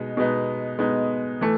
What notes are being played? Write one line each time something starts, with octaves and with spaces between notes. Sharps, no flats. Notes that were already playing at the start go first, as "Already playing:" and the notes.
Already playing: B2 G#3 B3 D#4
B2 G#3 B3 D#4
B2 G#3 B3 D#4
E3 A3